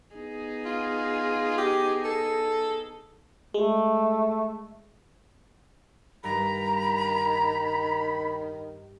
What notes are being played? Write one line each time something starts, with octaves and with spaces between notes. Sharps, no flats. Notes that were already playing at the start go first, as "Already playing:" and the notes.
B3 D#4 G#4
F4
G4
A4
G#3 A3
G2 D#3 A#5 B5